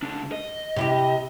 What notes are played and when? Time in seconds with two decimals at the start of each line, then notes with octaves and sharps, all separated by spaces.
0.02 C#2 D4
0.32 D#5
0.76 C3 E4 G4